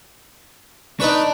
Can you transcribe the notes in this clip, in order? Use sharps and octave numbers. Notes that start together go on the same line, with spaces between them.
D4 D#4 B4 D5 C#6